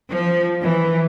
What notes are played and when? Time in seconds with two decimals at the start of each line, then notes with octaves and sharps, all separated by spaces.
0.12 F3
0.63 E3